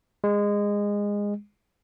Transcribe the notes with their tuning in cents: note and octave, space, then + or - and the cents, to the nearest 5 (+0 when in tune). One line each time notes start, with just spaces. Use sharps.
G#3 -20